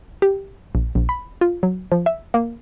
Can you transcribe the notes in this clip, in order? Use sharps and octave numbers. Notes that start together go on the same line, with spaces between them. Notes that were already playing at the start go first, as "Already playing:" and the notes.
G4
A#1
A#1
B5
F4
F#3
F3
E5
A#3